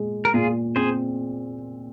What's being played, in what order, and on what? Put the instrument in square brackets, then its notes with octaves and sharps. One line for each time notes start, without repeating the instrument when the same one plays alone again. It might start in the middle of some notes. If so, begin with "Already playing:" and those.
Already playing: [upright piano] A#2 G#3
[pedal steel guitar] A#4
[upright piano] A#2 [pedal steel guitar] F4 G#4
[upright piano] C4 [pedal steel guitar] G#4 C5